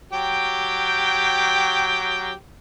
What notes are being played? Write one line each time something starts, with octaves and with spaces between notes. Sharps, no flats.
F#3 G4 G5